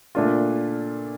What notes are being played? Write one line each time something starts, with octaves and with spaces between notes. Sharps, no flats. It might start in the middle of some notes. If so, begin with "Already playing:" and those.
A#2 A3 D4 F4